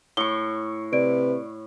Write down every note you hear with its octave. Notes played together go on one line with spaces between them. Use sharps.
A2 C#6 G7
C3 B4 D5 D7